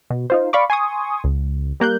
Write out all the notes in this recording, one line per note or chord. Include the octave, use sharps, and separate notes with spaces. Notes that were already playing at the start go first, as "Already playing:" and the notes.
B2
D#4 F4 C5
D5 F5 B5 C#6 D6
G#5 C6 C#6 D#6
C#2
G3 A#3 F#6 G6